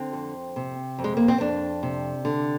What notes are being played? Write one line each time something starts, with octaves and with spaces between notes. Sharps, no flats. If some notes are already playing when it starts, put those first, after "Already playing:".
Already playing: D3 C4
F2
C3
F2
G#3
A#3
C4
F2 D4
C3
D3